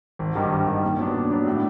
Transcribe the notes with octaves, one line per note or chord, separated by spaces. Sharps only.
G#1
G2 D#3 G3
G#1
G2 D#3 G3
A#2
F#3 B3 D4
A#2
F#3 B3 D4
A2